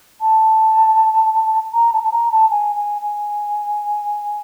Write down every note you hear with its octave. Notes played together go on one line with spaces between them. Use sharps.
A5
A#5
A5
A5
A#5
A5
G#5
G#5
G#5